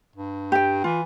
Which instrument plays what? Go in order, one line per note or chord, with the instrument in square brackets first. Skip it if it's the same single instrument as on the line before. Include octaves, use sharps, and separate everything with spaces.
[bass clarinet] G2
[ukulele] G4 G5
[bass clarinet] E3 [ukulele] F4